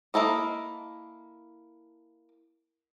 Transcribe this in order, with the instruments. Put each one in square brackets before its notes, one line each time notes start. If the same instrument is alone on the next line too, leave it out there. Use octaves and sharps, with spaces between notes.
[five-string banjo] A#3 E4 A4 D#5